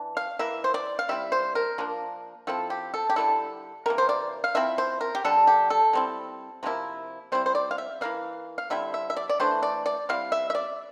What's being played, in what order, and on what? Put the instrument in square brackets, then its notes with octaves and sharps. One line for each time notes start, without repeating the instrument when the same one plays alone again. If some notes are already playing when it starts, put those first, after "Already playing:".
Already playing: [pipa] E3 D4
F5
E3 A#3 E4 E5
C5
D5
F5
G3 C4 E4 E5
C5
A#4
F3 A#3 D4
F3 C4 E4 A4
G4
A4
G4
D3 G3 A#3 E4 A4
C3 E3 A#3 A#4
C5
D5
F5
F3 C4 E4 E5
C5
A#4
G4
D3 G3 D4 A4
G4
A4
G3 C4 E4
C3 F3 A#3 E4
G3 C4 E4 C5
C5
D5
F5
E5
E3 A#3 E4 F5
F5
D3 G3 C4 E4 E5
E5
E5
D5
D5
E3 A3 D4 C5
D5
D5
G3 C4 E4 F5
E5
E5
D5